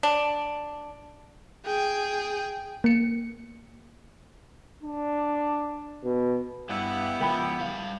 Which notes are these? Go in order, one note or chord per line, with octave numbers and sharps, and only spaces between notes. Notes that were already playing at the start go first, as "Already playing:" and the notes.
D4
G#4 G5
A#3 C#7
D4
B2
G2 B3 E4 G4
C#2 F3 A#4 G5 B5
G3 F5